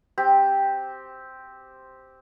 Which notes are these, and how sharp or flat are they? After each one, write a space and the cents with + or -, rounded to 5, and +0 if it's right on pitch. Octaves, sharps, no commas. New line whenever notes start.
C4 +0 G4 +0